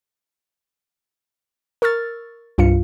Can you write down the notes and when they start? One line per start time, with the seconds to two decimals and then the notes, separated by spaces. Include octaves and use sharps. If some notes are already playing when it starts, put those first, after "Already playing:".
1.82 A#4 C#6 E6 F6 A6
2.58 C2 G2 F4 F5 C#7